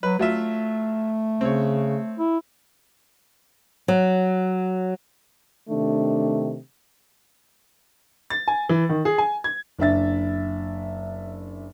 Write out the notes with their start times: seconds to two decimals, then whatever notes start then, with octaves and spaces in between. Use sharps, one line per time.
0.03 F#3 B4
0.19 F#3 A3 F4 E5
1.41 C#3 C4 C#5
2.19 E4
3.88 F#3
5.69 C3 D#3 A3 D4
8.30 A6
8.48 G#5
8.69 E3
8.89 D#3
9.05 G#4
9.18 G#5
9.44 G#6
9.79 F#1 D4 E5 A6